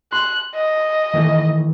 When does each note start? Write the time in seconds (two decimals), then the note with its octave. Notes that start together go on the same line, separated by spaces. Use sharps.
0.12 C6 F#6
0.55 D#5
1.14 D#3 E3 A3